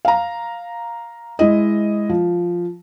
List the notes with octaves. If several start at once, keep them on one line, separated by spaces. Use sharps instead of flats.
F5 A#5
G#3 E4 D#5
F3